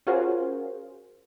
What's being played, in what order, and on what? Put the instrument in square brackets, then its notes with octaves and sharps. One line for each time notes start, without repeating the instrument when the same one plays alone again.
[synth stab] C#4 F4 F#4 G#4 A#4 C5